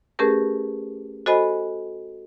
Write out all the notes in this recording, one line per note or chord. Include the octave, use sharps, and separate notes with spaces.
A3 C#4 G4 G#4 A#4 B4
F#4 A4 C5 D#5 G#5 B5